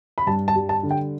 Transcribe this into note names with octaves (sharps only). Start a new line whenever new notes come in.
B5
G2 A5
A5
G3
A5
D3
G5